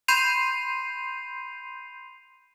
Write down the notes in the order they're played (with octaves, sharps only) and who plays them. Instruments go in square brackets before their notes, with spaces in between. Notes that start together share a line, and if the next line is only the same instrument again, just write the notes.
[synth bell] B5 C6 G6 C7 D#7 F7